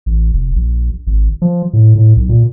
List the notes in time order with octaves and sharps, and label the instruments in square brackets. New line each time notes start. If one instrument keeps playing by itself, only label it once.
[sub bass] A1
F1
A#1
G#1
F3
A2
A2
B1
A#2